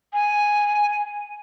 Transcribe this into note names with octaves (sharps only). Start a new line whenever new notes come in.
G#5